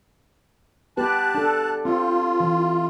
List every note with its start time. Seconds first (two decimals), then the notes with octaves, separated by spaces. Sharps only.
0.97 B3 G4 B4 A5 F#6
1.35 D4 A4
1.85 C4 F4
2.40 E3